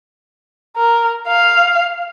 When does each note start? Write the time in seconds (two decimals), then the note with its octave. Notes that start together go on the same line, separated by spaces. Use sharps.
0.77 A#4
1.28 F5